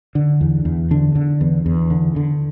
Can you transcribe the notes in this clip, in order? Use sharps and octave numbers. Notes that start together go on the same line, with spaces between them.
D3
E2
E2
D3 D4
D3
E2
E2
D3
D3